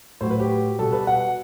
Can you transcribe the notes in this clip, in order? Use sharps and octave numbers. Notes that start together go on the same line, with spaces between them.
A2 F#3 C5
B4
G4
B2 G3 A4
B4
F#5